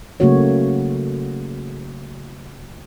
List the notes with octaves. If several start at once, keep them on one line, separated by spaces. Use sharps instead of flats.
C#3 F#3 A3 A#3 F#4 C#5